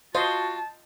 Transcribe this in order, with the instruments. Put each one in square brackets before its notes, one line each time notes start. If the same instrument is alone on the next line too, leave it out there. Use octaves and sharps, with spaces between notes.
[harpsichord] F4 [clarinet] F#4 [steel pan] C5 D#5 [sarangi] A5